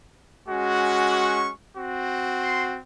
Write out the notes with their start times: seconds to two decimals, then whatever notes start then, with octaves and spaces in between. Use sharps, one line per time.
0.48 G#3 C#4 F#4
1.13 C#6
1.77 C4 F#4
2.41 C6